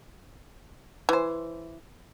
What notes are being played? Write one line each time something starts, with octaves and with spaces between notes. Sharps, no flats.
E3 C5